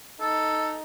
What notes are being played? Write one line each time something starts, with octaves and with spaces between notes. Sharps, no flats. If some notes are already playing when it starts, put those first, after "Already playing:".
D#4 A4